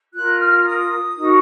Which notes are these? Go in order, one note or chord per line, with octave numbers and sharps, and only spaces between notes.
F4 A#4 F#6
F6
D#6
D#4 F#4 A#4